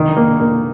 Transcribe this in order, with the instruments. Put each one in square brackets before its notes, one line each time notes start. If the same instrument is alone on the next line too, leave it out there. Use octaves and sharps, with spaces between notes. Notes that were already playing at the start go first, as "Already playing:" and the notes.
Already playing: [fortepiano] D#3
A#3
A#3